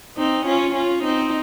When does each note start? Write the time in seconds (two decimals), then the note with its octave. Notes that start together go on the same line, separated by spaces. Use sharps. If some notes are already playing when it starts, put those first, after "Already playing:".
0.17 C4 D#4
0.46 C#4 F4
0.75 C#4 F4
1.04 C4 D#4